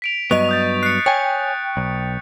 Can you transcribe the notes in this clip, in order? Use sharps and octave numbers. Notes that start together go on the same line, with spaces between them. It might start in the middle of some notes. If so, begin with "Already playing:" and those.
B6 D7 F7
G2 F#3 B3 D#5 C#6 F7
D#6 G6 A6
F#6 C7 C#7
C#5 G5 G#5
B1